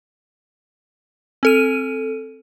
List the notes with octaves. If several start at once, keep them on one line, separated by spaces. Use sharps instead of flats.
C4 A4 D#7